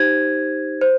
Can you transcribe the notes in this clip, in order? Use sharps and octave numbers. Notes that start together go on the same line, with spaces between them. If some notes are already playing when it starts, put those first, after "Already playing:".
Already playing: D#4 G4 C5 G#6
C5